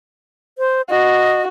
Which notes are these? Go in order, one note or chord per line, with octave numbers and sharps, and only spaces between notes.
C5
F#4 D#5